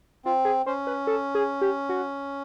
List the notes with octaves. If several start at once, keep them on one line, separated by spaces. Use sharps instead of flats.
C4 F4
G#4
C#4 C5
B4
A4
G#4
G4
F#4